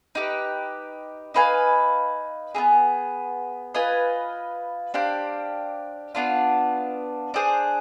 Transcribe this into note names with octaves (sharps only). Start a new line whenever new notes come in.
D#4 G4 B4
D#4 B4 F5 G#5
B3 D#4 G#4
F4 B4 D#5 G#5
D4 G4 C5 F5
B3 D4 F4
D4 G#4 C5